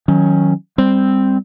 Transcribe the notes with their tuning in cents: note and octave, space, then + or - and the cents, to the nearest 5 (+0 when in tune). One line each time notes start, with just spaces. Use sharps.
D#3 +20 F#3 -5 C#4 +0
G3 +25 C4 +0